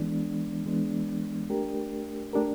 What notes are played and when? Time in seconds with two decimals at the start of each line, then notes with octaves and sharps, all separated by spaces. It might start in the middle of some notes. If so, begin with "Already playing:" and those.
Already playing: E3 G#3 B3 D4
0.66 E3 G#3 B3 D4
1.49 A3 D4 G4 A#4
2.33 A3 D4 G4 A#4